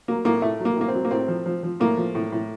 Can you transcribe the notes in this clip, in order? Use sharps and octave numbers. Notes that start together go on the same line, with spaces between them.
F#3 A#3
A2 A#3
A2 A3
F#3
A#3
A2 A#3
C4
F#3
A#3
A2 C4
F3
F3
F3
A2 A#3
F3
A2
A2